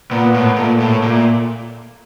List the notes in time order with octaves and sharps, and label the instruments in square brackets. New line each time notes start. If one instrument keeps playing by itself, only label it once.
[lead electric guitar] A#2 [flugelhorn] B3
[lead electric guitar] A2
[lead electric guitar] A#2 [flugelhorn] A3
[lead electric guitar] A2
A#2